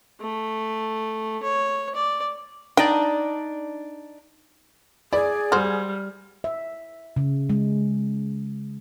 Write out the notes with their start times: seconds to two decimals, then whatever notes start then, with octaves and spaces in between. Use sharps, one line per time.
0.20 A3
1.43 C#5
1.95 D5
2.77 D4 D#4 D5 G5
5.13 E4 G#4 D5
5.52 G3 F#4 C5 F6
6.44 E5
7.16 C#3
7.50 G#3